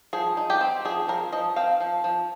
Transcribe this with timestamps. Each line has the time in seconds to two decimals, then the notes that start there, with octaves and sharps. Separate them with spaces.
0.13 F3 G#4
0.37 D#4
0.50 G4
0.61 C4
0.85 F3 G#4
1.08 F3 A#4
1.33 F3 D#5
1.56 C4 F5
1.80 F3
2.04 F3